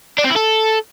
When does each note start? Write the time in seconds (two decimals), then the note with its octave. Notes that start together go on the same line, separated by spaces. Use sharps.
0.18 D4
0.24 C4
0.30 E4
0.36 A4